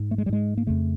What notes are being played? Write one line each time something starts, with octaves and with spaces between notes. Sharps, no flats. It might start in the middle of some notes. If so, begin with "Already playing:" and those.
Already playing: G#2
A3
G#3
G3
G#2 G#3
A#3
F2 C#3 A3